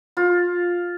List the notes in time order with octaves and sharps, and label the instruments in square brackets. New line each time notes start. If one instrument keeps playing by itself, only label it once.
[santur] F4